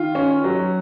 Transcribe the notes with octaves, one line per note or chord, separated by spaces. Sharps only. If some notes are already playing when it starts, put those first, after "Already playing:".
Already playing: D#3 F4
C#4
F#3